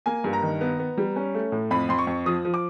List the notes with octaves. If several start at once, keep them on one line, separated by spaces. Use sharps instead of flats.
A#3 G#5
G2
A#5
D#3
B3
B3
G3
C#4
A3
A2
F2 B5
F2 C6
C#6
F2
F3 D#6
F3
D6